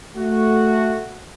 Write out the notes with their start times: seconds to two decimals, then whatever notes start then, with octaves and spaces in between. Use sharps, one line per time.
0.17 A3 F#4